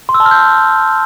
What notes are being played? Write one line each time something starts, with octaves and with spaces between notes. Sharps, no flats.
C6
E6
A5
F6
G6